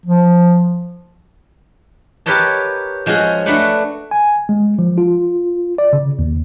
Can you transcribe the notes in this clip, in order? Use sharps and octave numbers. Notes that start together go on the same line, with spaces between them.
F3
G4 A#4 B4 C#5 D#5 A5
F3 G#3 C#4 F#4 G#4
A3 D4 F#4 B4 F#5
G#5
G#3
F3
F4
D5
C#3
D#2